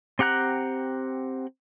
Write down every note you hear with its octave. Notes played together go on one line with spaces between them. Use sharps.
C4 G4 F#5 A#5 F#6